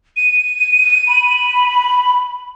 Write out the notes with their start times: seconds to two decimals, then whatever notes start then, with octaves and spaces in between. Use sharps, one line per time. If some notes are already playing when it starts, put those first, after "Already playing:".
0.17 D#7
1.08 B5